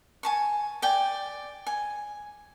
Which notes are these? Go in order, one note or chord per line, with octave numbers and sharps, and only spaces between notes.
G#5 A5 C#6
D5 G5 G#5
G#5